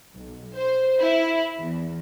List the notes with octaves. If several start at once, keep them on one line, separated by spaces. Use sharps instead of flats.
B1
C5
E4
E2